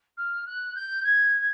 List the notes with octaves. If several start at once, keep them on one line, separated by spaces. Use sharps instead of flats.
F6
F#6
G6
G#6